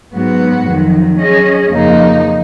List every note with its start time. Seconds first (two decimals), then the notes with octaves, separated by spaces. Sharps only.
0.13 G#2 F#3 B3 F#4
0.65 F2 D#3 F#3
1.18 F#3 C#4 G#4 D#5
1.70 F2 C#3 F3 A#3 D#4